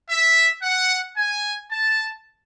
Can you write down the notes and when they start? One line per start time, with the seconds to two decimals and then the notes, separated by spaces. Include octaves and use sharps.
0.10 E5
0.62 F#5
1.16 G#5
1.71 A5